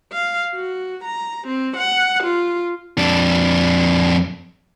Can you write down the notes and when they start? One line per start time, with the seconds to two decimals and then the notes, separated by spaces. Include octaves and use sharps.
0.13 F5
0.55 F#4
1.04 A#5
1.47 C4
1.77 F#5
2.24 F4
2.98 F2 D4